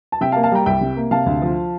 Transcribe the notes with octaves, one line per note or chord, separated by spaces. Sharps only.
A5
C3 E5 G5
F5 A5
A#3
F5 A5
G3 G5 A#5
C2 E5 G5
C3
A#3
C3 F5 A5
D2
F3